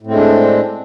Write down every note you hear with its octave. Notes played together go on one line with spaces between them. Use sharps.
A2 G#3 C4 D4